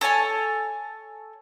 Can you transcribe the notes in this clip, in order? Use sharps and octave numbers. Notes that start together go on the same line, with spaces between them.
A4 C#5 G#5 A5